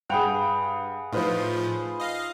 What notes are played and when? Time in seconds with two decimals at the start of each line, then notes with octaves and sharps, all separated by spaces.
0.09 G2 G#4 B4 F#5 G5 F7
1.13 A2 F3 D#4 F4 B4 C5
2.00 D#5 F5